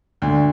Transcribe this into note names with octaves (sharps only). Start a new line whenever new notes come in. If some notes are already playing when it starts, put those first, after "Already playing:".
D2